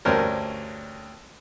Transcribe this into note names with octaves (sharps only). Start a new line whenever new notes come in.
D2 G2 C#4 A#4 C5